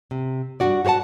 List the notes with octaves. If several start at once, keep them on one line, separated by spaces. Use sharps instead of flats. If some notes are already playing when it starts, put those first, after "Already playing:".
C3
G2 C#3 D4 F#4 D5
F#4 G4 C#5 F#5 A5